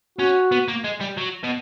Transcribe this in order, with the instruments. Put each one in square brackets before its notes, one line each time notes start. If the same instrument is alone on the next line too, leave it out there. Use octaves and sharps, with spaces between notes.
[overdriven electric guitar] C#4 [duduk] F#4
[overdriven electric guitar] B3
A#3
G#3
G3
F#3
B2